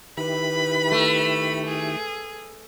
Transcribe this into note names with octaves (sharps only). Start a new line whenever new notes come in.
D#3 E4 G4 B4 B5
A3
G#4